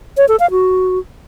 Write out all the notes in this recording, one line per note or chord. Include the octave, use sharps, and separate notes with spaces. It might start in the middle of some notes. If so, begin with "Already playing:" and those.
C#5
A4
F5
F#4